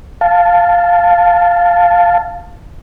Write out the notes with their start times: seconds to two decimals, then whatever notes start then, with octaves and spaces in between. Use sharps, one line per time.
0.21 F5 A5